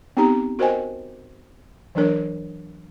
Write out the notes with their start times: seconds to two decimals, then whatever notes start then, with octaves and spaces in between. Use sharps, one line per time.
0.17 B3 C4 D#4 G4 A#5
0.59 F#4 A#4 C5 D#5 G5 G#5
1.95 E3 F#3 A#3 D4 A#4 C#5